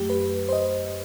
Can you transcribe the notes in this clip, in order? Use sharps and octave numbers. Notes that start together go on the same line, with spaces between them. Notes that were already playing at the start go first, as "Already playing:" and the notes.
Already playing: F#2 F#3 A3 G4
B4
C5
D#5